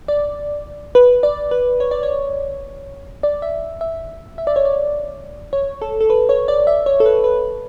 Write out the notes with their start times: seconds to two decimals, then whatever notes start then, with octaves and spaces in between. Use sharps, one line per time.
0.08 D5
0.95 B4
1.23 D5
1.51 B4
1.80 C#5
1.91 D5
2.03 C#5
3.23 D5
3.42 E5
3.81 E5
4.38 E5
4.47 D5
4.56 C#5
4.65 D5
5.53 C#5
5.82 A4
6.01 A4
6.10 B4
6.29 C#5
6.48 D5
6.67 E5
6.86 C#5
7.00 A4
7.06 B4
7.24 B4